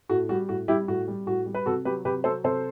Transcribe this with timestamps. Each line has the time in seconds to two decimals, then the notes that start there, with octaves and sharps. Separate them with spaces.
0.09 A2 F#4
0.29 G3 F#4
0.49 A2 F#4
0.68 G3 E4 G4
0.88 A2 F#4
1.08 G3
1.26 A2 F#4
1.46 G3
1.55 B4
1.66 C3 F#4 A4
1.85 F#3 G4 B4
2.05 C3 G4 B4
2.24 F#3 A4 C5
2.44 C3 A4 C5